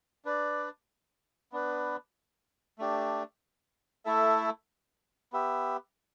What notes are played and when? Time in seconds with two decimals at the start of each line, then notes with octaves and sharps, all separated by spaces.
0.25 D4 B4 D5
1.52 B3 D4 B4
2.78 A3 D4 G4
4.05 A3 E4 A4 E5
5.33 B3 G4 E5